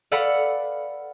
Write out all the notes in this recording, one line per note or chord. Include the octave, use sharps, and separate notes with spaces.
A4 B4 D5 F5 F#5 B5